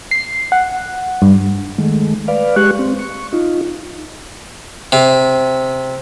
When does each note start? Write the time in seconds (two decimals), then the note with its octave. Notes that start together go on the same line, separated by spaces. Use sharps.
0.11 C7
0.52 F#5
1.22 G2
1.78 D#3 G#3 A3
2.28 B4 D5 F5
2.56 G#3 G4 C#6 F#6
2.79 C4
2.99 C#6
3.33 D#4 F4
4.92 C3